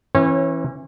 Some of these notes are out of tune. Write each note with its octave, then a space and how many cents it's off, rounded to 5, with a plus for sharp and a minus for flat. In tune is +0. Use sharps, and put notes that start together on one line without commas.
E3 +0 C#4 -35 C#5 -25